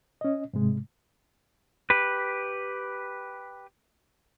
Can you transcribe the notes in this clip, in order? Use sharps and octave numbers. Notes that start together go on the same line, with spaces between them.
C#4 D#5
G#2 C3 G#3
G4 B4